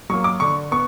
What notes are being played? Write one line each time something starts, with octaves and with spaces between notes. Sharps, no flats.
F#3 A#3 C#6
D6
D3 C#6
B3 C#6